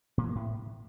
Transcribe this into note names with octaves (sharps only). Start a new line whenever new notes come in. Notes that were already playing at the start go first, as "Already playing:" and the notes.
A#2
E3
A#3
A2